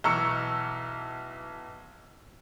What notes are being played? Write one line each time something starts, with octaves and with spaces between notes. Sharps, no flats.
B1 E3 A#5 C#6 E6 C#7